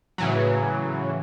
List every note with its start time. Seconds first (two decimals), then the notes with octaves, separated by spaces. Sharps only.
0.18 A2 C#3 E3 F#3